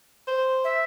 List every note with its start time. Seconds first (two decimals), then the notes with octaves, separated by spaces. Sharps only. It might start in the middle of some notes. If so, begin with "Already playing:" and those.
0.28 C5
0.64 E5